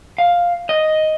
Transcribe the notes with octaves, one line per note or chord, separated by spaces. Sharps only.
F5
D#5